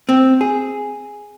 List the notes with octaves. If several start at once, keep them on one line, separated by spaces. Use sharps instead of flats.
C4
G#4